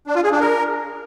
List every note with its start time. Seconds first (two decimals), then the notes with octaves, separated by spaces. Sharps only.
0.07 D4
0.15 F4
0.24 G#4
0.32 D4
0.40 A#4